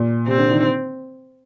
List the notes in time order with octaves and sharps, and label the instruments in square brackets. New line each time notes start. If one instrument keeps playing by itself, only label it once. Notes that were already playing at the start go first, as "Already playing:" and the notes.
Already playing: [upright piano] A#2
[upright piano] C3 [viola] C4
[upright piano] D3
D#3